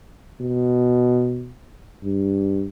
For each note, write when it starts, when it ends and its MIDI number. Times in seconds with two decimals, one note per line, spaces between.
0.41 1.52 47
2.04 2.66 43